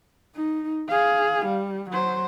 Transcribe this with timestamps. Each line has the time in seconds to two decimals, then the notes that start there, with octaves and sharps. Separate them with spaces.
0.35 D#4
0.88 G#4 F5
1.45 G3
1.90 F#3 C5